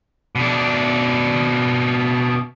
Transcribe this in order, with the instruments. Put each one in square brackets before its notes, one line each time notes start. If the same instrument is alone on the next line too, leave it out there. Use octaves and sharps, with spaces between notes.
[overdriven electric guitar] B2 D4